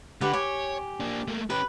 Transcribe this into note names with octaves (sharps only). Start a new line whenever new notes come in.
D3 G4 B4 F#5
G4 C#5 G#5
A#3 D4
A3 A#3
C#4 G4 B4